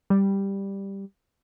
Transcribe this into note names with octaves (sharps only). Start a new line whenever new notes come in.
G3